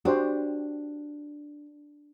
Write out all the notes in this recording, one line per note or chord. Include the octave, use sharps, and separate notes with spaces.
D4 F#4 G4 C5